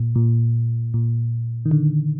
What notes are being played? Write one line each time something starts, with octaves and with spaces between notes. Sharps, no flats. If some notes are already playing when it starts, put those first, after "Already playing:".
Already playing: A#2
A#2
A#2
D#3
D3